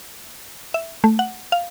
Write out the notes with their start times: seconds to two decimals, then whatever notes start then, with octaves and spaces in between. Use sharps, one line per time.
0.74 E5
1.04 A3
1.19 F#5
1.52 F5